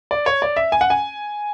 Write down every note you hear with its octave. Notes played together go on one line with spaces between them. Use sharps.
D5
C#5
D5
E5
G#5
F#5
G#5